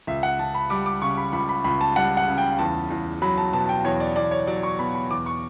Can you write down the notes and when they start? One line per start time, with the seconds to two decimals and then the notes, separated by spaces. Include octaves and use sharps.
0.07 C#2 E5
0.23 F#5
0.39 C#2 A5
0.55 B5
0.70 G3 D6
0.86 D6
1.02 C#3 C#6
1.17 B5
1.33 C#2 B5
1.49 B5
1.64 C#2 B5
1.81 A5
1.96 G3 F#5
2.17 F#5
2.28 C#3
2.38 G5
2.59 E2 A5
2.90 E2
3.22 F#3 B5
3.38 A5
3.53 B2 A5
3.69 G5
3.84 E2 C#5
4.00 D5
4.16 E2 D5
4.31 C#5
4.47 F#3 D5
4.63 C#6
4.79 B2 B5
4.95 B5
5.10 E2 D6
5.26 C#6